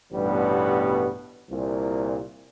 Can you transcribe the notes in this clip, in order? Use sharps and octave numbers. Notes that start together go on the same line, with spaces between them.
A1 G2 B2 G3 B3
C2 A#2